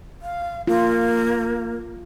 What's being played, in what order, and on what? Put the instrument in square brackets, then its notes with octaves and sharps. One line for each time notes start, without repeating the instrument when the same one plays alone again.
[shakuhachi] F5
[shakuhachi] A#3 [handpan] F4